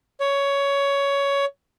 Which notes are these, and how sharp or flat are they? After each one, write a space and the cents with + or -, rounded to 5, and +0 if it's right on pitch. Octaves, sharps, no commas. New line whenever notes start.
C#5 +15